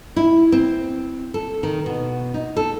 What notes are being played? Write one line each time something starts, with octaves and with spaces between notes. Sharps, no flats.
E4
C4
A4
D#3
B2
D#4
A4